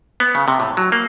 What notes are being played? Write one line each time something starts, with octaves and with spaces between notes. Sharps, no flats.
B3
C#3
C3
A2
F#3
A#3